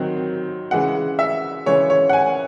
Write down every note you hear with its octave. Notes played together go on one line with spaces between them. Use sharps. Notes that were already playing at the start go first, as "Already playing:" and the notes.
Already playing: D#3 F#3 C4
C#3 E3 G#3 F#5
E5
C#3 E3 G#3 C#5
C#5
F#5
G#5